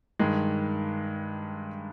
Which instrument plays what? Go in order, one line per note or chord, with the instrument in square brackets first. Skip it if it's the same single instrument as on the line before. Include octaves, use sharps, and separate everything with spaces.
[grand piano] G2 D#3 G#3